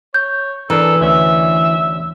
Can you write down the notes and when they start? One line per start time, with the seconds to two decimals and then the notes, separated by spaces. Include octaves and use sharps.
0.14 C#5 G6
0.70 E3 D4 A4 A#4
1.01 D2 C#4 E5